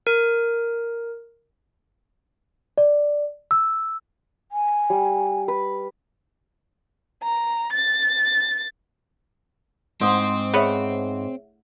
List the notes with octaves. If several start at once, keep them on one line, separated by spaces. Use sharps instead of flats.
A#4
D5
E6
G#5
G3
B4
A#5
A6
G#2 C4 C6 D#6
B3 C#4 G#4 C#5 E5